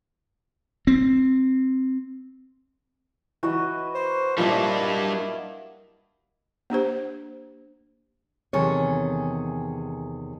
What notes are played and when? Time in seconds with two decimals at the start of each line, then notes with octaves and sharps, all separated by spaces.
0.87 C4
3.43 E3 F#4 B4 D#5
3.95 C5
4.38 A#2 F3 G3 A#3 D4 E4 D#5 B5
6.70 A#3 D4 G4 C5
8.53 E2 C3 D#3 G#4 A4 C#5